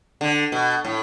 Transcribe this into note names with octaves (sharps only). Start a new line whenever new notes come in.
D3
B2
A2